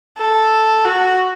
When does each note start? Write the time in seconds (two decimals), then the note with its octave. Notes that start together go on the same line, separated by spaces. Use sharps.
0.18 A4
0.85 F#4